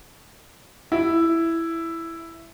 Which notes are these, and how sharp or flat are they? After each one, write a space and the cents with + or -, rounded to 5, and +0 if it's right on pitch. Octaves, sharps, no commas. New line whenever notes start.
E4 +5